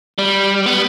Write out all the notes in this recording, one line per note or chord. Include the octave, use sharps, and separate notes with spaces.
G3
B3